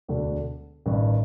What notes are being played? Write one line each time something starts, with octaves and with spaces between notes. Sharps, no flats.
E1 D2 D3
A1 G2 D#3